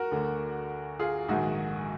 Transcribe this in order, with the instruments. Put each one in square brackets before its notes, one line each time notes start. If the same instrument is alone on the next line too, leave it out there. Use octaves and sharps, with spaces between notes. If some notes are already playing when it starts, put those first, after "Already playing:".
Already playing: [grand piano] F#4 A#4
D2 D3
F4 G#4
A#1 G#2 D#3 D#4 F#4